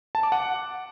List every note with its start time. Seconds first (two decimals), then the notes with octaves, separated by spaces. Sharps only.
0.15 A5
0.23 D6
0.32 F#5